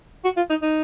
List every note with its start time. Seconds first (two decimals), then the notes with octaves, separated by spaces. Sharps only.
0.24 F#4
0.37 F4
0.50 D#4
0.62 D#4